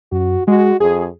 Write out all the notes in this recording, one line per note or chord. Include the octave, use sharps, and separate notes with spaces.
F#2 F#4
G#3 F#4
F2 G#4